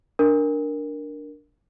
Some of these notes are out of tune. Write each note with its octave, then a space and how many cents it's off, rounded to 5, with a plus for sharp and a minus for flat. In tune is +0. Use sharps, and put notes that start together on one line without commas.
D4 +0 A#4 +0